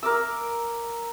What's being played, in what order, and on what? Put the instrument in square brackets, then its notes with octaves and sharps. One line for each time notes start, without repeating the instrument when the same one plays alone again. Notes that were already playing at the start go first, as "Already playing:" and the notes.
[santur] A#4 D6 E6